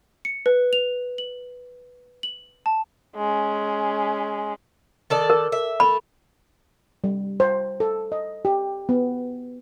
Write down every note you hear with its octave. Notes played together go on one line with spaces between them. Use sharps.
C#7
B4
F7
F#7
F#7
A5
G#3 C#4
D#3 A4 D5
A#4
E5
A3 B5
G3
C5
A4
D#5
G4
B3